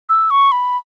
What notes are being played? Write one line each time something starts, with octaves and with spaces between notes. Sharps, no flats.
E6
C#6
B5